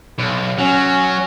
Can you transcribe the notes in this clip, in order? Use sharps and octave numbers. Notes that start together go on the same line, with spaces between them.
B1
F#3 C#4